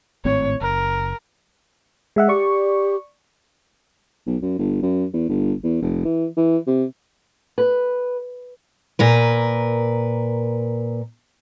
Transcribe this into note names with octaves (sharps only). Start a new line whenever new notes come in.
G#1 A2 C4 C#5
F#1 A#4
G#3 E5 F#5
G4 D5 C#6
B1
F#2
G1
F#2
E2
G1
E2
F1
E3
E3
C3
B4
A#2 A#4 B4